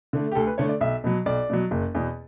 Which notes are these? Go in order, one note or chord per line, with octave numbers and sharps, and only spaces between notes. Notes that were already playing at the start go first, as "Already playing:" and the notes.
D3 A3
G4
D2 A4
B4
D3 A3 C#5
D5
B1 E5
B2 F#3
B1 D5
B2 F#3
F#1
E2 B2